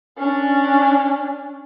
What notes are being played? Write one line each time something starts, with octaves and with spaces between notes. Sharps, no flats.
C#4 D4